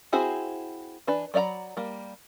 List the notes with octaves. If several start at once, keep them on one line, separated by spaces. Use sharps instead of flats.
C4 E4 F#4 G#4 C5
E3 D4 B4
F#3 D5 E5 A#5 B5
G3 A#3